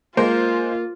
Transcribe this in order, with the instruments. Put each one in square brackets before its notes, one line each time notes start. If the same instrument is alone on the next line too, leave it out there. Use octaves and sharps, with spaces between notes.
[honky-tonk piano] G#3 C5 [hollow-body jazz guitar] A#3 [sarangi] F4